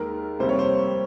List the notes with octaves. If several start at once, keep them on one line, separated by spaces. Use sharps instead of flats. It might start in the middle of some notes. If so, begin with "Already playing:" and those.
Already playing: D#2 D#3 G#3 A#4
F2 C3 G3 A#3 C5
C#5
C5